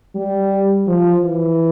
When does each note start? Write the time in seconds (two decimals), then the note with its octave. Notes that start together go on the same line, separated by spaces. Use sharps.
0.15 G3
0.87 F3
1.23 E3